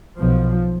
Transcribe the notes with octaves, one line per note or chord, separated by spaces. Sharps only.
B1 B2 F3